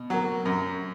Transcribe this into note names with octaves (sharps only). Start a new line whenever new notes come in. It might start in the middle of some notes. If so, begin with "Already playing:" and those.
Already playing: B2
F#3 A#3
F#2